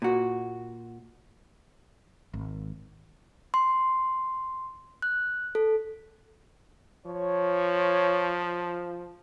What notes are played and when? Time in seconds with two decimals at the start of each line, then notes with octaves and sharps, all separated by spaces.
0.02 A#2 F#4
2.34 G#1
3.54 C6
5.02 F#6
5.55 A4
7.06 F3 C#5